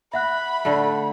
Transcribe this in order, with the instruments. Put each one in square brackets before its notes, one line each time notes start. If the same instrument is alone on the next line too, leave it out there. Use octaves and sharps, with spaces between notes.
[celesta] E5 F#5 F#6 [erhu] B5
[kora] D3 A3